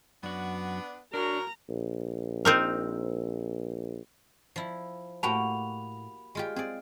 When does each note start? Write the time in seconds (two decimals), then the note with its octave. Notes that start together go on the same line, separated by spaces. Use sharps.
0.23 F#2 B3 D4 F#4
1.14 A2 F#3 D4 F#4 A#4 A#5
1.69 A#1
2.45 C4 D#4 A#4
4.56 F3 E4
5.23 A2 A#3 F#4 G4 A5 B5 F7
6.35 G#3 F4 G4
6.56 C4 G#4 D5